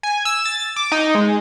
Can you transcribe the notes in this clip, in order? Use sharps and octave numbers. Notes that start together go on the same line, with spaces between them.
G#5
E6
A6
D6
D#4
G#3